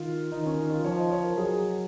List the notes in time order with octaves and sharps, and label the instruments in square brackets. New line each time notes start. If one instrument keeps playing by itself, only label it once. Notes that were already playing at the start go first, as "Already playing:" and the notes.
Already playing: [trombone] D#3 [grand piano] F4
[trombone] D#3 [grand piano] D#4
[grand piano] C#4
D#4
F4
[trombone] F3 [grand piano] C#5
[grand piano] D#5
C#5
A#4
[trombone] F#3 [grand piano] G#4